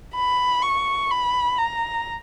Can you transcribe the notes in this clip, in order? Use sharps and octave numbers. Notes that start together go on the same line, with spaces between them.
B5
C#6
B5
A#5